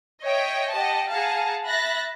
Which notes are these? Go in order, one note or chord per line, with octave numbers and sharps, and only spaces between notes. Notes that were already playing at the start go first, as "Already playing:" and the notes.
C#5 D#5 E5 G5
G4 D#5 F#5 A5
G#4 F5 F#5 A5 A#5
E5 B5 F#6 A6 A#6